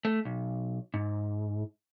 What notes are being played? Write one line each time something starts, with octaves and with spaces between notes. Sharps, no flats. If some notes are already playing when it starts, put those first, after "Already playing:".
A3
B1
G#2